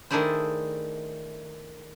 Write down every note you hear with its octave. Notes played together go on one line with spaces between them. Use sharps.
D#3 A3 D4 E4 G#4 C5